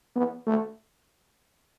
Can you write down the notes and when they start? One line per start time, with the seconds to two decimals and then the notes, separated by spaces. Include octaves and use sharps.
0.16 B3
0.47 A3